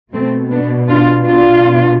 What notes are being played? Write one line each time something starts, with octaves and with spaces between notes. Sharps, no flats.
B2 A3 C4
B3 D4
D4 F4
D4 F4
B2